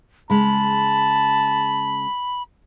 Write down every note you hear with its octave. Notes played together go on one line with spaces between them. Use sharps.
C#3 G#3 A5 B5